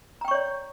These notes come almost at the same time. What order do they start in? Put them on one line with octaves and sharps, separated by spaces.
A#5 G5 C#6 C#5 D5